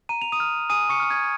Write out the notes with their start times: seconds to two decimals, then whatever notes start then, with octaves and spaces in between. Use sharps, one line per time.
0.09 A#5 D#7
0.22 F7
0.32 D#6 D#7
0.40 F6
0.70 G#5 D#6 D#7
0.89 C#6 C#7
1.00 F6
1.10 G#6